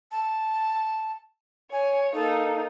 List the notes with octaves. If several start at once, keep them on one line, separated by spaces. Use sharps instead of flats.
A5
C#5 G#5
A#3 D#4 A4